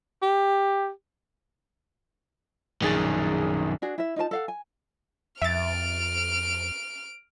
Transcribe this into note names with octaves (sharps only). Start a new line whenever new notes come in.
G4
A#1 F#2 D#3 G#4 A6
D4 F#4 G#4
E4 E5
D#4 F4 B4 A5
A4 F5 F#5
G#5
F2 E5 F6 A6 D7